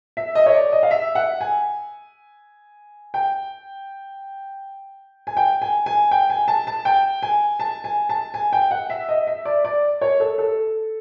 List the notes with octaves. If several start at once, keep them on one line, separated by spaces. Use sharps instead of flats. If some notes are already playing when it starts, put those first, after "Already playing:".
E5
D#5
C#5
D5
D#5
F5
E5
F#5
G#5
G5
G#5
G5
G#5
G#5
G5
G#5
A5
A5
G5
G#5
A5
G#5
A5
G#5
G5
F#5
E5
D#5
E5
D5
D5
C#5
A4
A4